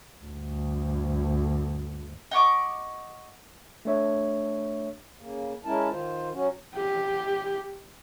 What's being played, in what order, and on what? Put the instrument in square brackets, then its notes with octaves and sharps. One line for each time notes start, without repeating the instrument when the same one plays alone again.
[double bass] D2 G2
[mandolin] D#5 F#5 C#6 D6
[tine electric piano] A3 D4 C#5 E5
[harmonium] C#3 A#3
G#3 C#4 E4 A#4 A5
D#3 F4 C5
F#3 C#4 F#4
[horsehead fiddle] G4